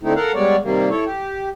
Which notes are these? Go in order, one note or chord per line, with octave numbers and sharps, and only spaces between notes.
D3 A3 C4 D#4 E4
A4 A#4 F5 F#5
G3 G#3 B3 C#5 D5
C3 D#3 G3 A#3
E4 A4 C#5
G4